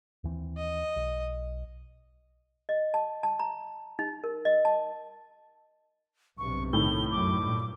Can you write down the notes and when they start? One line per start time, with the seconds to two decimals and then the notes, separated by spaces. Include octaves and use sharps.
0.24 D#2 E3 C4
0.57 D#5
0.96 B1
2.69 D#5
2.94 A5
3.23 A5
3.39 A#5
3.99 D#4
4.24 A#4
4.45 D#5
4.65 A5
6.38 B1 G2 C3 C#6
6.73 A2 D#3 G7
7.11 F#2 D6
7.41 G2 A#2